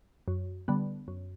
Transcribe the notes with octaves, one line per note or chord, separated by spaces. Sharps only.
F#2
D3 G3 B3
F#2